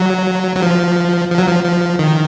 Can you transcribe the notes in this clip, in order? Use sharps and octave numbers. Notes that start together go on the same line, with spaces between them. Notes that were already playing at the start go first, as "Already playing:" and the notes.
Already playing: F#3
F#3
F3
F3
F#3
F3
F3
D#3